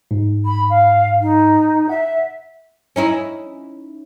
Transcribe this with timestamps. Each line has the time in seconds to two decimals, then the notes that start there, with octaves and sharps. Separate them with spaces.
0.11 G#2
0.46 B5
0.70 F5
1.22 D#4
1.89 E5 F#5
2.96 C#4 D#4 E4